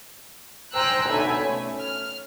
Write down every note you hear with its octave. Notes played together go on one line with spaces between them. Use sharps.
C5 G5 G#5 A#5 E6 F#6
B1 D3 A3 E5 G#5 B5
A3 C#4
F6